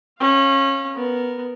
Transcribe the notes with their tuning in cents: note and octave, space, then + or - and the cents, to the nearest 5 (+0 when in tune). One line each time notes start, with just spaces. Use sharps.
C#4 -25 F5 +0
B3 +0 A#4 +0